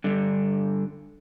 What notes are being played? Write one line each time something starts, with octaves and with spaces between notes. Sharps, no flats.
G2 D3